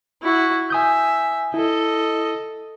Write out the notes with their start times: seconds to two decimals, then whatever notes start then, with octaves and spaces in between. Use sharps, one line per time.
0.22 E4 F#4
0.70 E5 G#5 D#6 G6
1.54 E4 A4 D#5